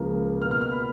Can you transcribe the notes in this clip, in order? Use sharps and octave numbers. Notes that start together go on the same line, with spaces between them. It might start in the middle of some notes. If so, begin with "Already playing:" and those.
Already playing: C#2 C#3 F3 A#3
B2 A#3 F6
F6
F6
B5